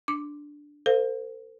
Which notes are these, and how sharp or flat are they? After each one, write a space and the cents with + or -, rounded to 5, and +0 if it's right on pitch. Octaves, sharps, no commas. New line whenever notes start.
D4 +0 D6 +0
A4 +45 C5 -25 F5 +0